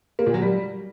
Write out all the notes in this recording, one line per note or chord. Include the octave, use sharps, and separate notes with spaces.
A#3
A#2
F#3
G3